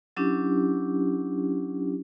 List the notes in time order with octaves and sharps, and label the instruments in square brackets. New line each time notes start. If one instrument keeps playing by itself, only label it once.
[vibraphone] F#3 C#4 D4 E4 G4